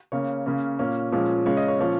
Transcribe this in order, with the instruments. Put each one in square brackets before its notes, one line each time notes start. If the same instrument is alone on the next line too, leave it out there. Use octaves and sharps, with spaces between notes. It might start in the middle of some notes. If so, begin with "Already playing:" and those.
[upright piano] C#3 A#3 C#4 C#5
C#3 A#3 C#4
A#2 A#3 C#4
A#2 F3 G#3 C#4
C#3 G#3 C#4 C#5
D#5
C#5
A#2 F3 C#4